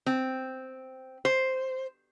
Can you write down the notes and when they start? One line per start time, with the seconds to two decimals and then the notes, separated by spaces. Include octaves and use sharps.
0.06 C4
1.25 C5